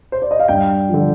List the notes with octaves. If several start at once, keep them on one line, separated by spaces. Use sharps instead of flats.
C5
D5
D#5
F5
G2 G5
D3 F3